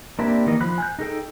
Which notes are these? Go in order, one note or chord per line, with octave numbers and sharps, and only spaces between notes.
A#3 C4 D4 E4 G4
D#3 E3 A#3 D#5
F3 B5 F#6
G#5 F#6 G6
D#4 G#4 A4 G5